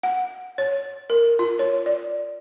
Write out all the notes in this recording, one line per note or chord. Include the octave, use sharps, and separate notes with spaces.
F#5
C#5
A#4
F4
C#5
D5